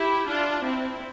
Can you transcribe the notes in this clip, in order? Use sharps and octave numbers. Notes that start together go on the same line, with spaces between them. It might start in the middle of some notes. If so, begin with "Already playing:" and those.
Already playing: E4 G4
D4 F4
C4 E4